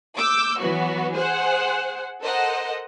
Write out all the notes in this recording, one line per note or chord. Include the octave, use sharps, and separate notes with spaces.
D6 E6 G6
E3 F#3 B3 F#4
G#4 C5 F#5
A4 A#4 C5 D#5 F#5